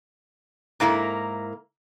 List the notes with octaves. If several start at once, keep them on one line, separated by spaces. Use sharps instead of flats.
G#2 A#3 E4 A#4